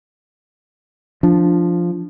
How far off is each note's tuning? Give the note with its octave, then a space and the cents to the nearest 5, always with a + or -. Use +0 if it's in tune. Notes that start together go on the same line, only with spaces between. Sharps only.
F3 +0 D4 +0